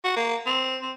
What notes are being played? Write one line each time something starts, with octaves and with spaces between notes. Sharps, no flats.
F#4
A#3
C4
C4